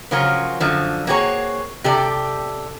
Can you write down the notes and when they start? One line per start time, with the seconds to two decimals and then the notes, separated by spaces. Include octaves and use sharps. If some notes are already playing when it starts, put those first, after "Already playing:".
0.11 C#3 F3 F#3 C#4 F4 A#4
0.60 F#2 D3 F3
1.07 A#3 C4 F#4 G#4 C#5
1.84 C3 G4 A4 D5